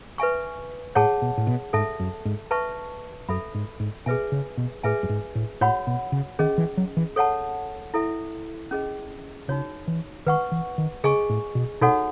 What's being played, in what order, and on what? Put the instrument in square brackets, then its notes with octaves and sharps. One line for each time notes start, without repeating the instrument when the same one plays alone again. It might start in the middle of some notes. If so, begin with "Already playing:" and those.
[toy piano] B4 E5 G#5 C#6
[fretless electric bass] A2 [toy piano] G#4 C#5 F#5 A5
[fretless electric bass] B2
A2
B2
[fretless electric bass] G#2 [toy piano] A4 E5 A5
[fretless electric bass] F#2
G#2
[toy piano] B4 E5 A5 C#6
[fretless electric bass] F#2 [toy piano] A4 E5 B5
[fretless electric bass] G#2
G#2
[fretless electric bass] B2 [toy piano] G#4 B4 E5 G#5
[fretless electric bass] C#3
B2
[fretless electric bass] A2 [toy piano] G#4 B4 E5 G#5
[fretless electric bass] F#2
G#2
A2
[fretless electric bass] A2 [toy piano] F#4 C#5 F#5 B5
[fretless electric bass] B2
C#3
[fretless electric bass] D#3 [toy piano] C#4 G#4 D#5
[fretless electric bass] E3
F#3
E3
[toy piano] A4 C#5 F#5 A5
E4 A4 E5
C#4 G#4 D#5
[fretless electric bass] C#3 [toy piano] D#4 F#4 C#5
[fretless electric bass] E3
[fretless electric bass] D#3 [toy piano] B4 F#5 C#6
[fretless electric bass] E3
D#3
[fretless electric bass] C#3 [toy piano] G#4 D#5 G#5 C#6
[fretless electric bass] A2
B2
[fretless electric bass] B2 [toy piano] D#4 F#4 A4 C#5 F#5